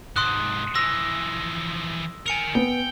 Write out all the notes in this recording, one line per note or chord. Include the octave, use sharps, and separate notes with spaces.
G#2 C3 C6 D#6 F#6
E3 F3 E6 A#6
A#4 G5 G#5 C#7 F7
B3 G5